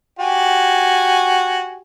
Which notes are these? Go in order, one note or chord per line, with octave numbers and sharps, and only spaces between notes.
F#4 G4 G#5